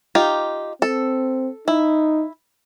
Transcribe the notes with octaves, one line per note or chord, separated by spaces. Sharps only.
D#4 F4 G4
C4 A4
D#4 E4